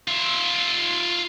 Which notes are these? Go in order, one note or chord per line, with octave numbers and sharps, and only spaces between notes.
F4 E5